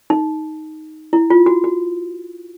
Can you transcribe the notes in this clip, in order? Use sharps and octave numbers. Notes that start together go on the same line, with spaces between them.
D#4
E4
F4
F#4
F#4